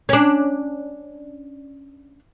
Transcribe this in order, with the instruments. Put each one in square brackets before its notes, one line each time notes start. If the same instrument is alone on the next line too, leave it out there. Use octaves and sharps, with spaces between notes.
[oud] C#4 D4